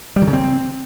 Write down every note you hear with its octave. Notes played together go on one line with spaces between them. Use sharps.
G3
D#3
C#3
C4